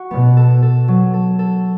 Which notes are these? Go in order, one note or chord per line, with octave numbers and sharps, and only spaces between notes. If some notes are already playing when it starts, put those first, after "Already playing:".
Already playing: F#4
B2 B3
A4
A4
F#3
A4
A4